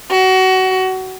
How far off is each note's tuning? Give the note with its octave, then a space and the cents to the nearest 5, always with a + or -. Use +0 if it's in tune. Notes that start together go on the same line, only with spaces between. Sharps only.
F#4 +25